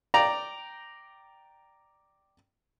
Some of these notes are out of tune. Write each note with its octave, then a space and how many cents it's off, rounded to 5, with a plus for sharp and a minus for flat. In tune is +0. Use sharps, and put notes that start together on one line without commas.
D5 +0 G5 -10 A#5 +0